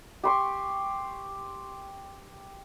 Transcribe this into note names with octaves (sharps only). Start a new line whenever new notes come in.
G4 C6 C#6